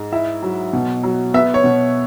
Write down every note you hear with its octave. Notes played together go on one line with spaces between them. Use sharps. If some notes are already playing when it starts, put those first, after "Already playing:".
Already playing: G#2 G#3
E4 E5
F#3
B2
F#3
B3 E5
C#5
B2